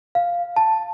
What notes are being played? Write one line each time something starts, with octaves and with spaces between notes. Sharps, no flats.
F5
A5